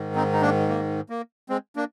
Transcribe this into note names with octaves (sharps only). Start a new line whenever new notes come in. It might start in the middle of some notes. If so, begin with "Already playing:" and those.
Already playing: G#2 D#3
C4 D#4
D#4
A#3 D4
A#3
A#3
G#3 C4
A#3 D4